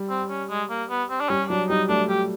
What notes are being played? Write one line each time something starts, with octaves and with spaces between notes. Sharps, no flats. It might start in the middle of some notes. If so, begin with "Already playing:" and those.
Already playing: G3
C4
C#4
G#3
A#3
B3
C4
D4
G3 C#4
F#3 D4
G3 D#4
A3 D4
G4